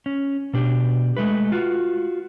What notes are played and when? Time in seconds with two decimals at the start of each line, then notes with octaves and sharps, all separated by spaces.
0.06 C#4
0.54 B2 D4 G4
1.17 G#3 A3 B4
1.52 F4 F#4